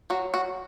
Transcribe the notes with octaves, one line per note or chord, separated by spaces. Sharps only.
F#3 F#4
F#4